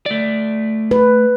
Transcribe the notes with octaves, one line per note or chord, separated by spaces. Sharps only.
A3 D5
B4